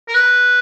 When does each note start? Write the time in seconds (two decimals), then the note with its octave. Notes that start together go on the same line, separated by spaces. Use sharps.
0.08 A#4
0.14 B4